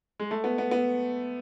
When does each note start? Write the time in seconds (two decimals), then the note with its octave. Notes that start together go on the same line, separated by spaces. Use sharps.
0.19 G#3
0.31 A3
0.44 B3
0.58 B3
0.71 B3